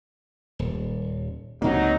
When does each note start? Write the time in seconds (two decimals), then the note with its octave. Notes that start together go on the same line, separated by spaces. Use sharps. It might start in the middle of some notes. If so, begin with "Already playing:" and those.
0.59 D#1
1.62 C#2 C3 F#3 A#3 D#4